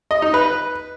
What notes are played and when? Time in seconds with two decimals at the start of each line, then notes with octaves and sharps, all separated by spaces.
0.11 D#5
0.22 D#4
0.34 B4